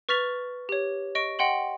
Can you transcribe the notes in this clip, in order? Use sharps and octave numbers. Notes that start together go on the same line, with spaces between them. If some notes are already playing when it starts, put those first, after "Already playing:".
B4 C#6 F6 A6 B6 F7
G4 C#5
D#5 C#6 D7
D#5 F#5 G5 C6 F#7